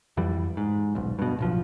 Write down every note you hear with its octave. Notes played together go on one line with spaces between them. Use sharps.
F2 E3 G3
G#2
D#1 B1
G2 B2
D1 B1 F3